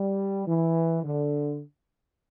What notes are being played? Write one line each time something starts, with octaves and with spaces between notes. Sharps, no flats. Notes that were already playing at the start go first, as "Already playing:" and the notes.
Already playing: G3
E3
D3